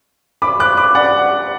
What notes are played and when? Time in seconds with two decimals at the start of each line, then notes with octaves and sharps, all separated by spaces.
0.42 B5 D6
0.60 D6 F#6
0.77 B5 D6
0.95 D5 F#5